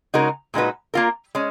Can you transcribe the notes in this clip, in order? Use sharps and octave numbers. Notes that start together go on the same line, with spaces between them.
C#3 G#3 D#4 F#4 A#4
A#2 G#3 D#4 F#4 B4
A#3 F4 A#4
G#3 C#4